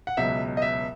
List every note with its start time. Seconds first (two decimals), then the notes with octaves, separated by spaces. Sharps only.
0.07 F#5
0.17 C#2 B2 F#3 E5
0.57 D#5
0.62 E5